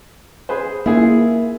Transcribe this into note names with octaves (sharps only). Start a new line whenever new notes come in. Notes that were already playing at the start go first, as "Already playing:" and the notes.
G#4 B4 C5
A#3 E4 F4 G#4